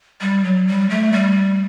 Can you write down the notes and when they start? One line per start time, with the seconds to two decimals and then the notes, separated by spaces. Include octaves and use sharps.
0.21 G3
0.44 F#3
0.67 G3
0.90 A3
1.13 G3